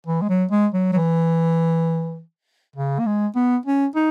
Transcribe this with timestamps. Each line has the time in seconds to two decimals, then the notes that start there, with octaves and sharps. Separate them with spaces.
0.07 E3
0.22 G#3
0.29 F#3
0.51 G#3
0.74 F#3
0.92 F#3
0.96 E3
2.76 C#3
2.99 A#3
3.06 G#3
3.36 B3
3.65 C#4
3.96 D#4